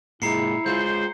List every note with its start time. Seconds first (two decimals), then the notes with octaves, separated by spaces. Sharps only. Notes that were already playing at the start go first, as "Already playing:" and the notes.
0.22 A#2 G#3 E4 A#5 C7 C#7
0.66 G#3 F4 C5 G6